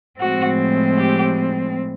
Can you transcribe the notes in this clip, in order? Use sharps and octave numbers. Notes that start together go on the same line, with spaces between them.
A2 F3 G#3 C4 F#4
G4